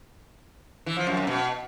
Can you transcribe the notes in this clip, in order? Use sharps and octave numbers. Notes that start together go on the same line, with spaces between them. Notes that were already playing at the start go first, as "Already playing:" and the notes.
E3
F3
F#2
F#2
B2